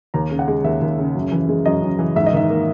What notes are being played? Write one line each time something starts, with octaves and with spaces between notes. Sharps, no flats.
D#2 A#5
C#3
F#5
G#3
D#2 E5
D#2
C#3
F#2
E3
G#3
F#2 D#5
F#2
E3
G#2 E5
D#5
D#3 E5
A#3